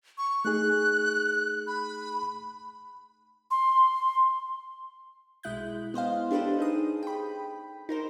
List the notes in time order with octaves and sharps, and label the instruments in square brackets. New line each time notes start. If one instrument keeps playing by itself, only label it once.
[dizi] C#6
[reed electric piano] A3 D#4 G#4 [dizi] F#6
[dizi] B5
[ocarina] C6
[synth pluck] B1 G#3 E4 F#6 G6
B3 C5 D#5 F5
D4 G4 A4 B4 C5
D#4 G#4 D#6
G5 B5
D#4 A#4 C5